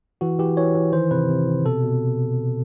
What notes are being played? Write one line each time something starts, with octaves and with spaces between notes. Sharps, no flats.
E3 F#4
E3 G4
E3 C#5
E3
D#3 C5
C3 B4
C3
C3
B2 A4
B2